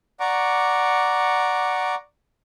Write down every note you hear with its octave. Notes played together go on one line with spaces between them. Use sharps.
D5 F#5 A#5 C#6 D6